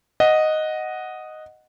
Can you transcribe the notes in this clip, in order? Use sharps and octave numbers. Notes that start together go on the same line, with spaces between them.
D#5 F#5